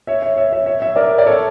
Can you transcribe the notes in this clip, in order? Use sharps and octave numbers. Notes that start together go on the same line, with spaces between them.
C#5 E5
C#5 E5
C#5 E5
C#5 E5
C#5 E5
C#5 E5
A#4 D5
D5
A4 C#5